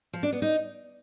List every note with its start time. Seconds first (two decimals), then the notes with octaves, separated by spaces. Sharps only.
0.13 F3
0.23 D4
0.32 B3
0.42 D#4